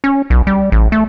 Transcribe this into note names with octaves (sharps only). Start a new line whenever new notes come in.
C#4
B1
G3
A1
A3